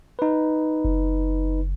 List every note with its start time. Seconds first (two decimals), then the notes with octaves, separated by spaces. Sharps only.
0.19 D#4 B4
0.85 F#1